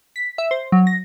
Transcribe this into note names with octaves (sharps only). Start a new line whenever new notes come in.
B6
E5
C5
F#3
A#6